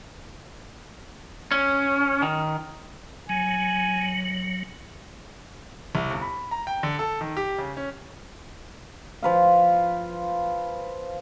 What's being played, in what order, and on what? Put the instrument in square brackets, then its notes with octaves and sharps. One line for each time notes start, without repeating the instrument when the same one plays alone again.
[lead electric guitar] C#4
D#3
[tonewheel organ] F#3 [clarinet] G#5
[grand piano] C2
G1
B5
A#5
G5
D3
A4
D#3
G4
C#3
C#4
[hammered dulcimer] F3 B4 F5